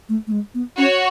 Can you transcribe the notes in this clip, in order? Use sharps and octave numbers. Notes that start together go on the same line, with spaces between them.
A3
A3
G#3
B3
C#4 F#4 C#5